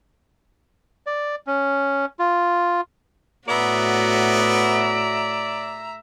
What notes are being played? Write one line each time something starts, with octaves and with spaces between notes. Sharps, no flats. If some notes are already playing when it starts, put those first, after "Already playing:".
D5
C#4
F4
A2 B3 F#4 D5 E5 A#5